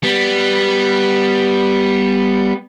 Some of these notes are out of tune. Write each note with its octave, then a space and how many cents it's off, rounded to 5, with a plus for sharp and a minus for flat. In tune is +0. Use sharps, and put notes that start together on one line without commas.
G3 +0 B3 +0